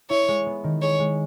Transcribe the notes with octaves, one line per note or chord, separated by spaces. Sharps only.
E4 C#5
G#3
B3
D#3
G#4 C#5
G#3